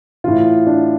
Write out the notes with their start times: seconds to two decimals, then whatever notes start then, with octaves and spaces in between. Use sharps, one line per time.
0.24 A2 E3 F4
0.67 D4